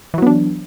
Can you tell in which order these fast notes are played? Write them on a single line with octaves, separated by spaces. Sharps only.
E3 F#3 B3 D4